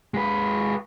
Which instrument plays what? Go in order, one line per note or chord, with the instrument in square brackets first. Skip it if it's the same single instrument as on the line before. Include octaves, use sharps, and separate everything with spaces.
[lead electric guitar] G#3 B4